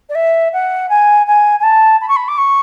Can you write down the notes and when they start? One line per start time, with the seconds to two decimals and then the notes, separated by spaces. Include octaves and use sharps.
0.09 D5
0.15 E5
0.53 F#5
0.89 G#5
1.27 G#5
1.59 G#5
1.63 A5
2.01 B5
2.08 C#6
2.16 B5
2.28 D6
2.37 C#6